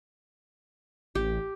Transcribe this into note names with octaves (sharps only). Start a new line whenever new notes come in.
A1 G4